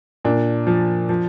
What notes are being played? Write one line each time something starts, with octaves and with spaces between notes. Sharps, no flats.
A#2 D4
F3
F3